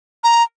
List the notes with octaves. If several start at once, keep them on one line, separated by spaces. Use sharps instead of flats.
A#5